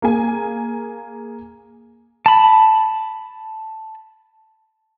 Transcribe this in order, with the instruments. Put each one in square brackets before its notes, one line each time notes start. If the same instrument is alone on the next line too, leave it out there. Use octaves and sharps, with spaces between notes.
[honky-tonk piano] A#3 G#4 G#5
[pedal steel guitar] A5 B5